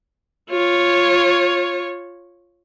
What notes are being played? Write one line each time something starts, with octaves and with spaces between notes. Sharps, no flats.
F4 C#5